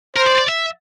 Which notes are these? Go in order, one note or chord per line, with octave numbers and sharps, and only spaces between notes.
A#4 C5
D5
D5
E5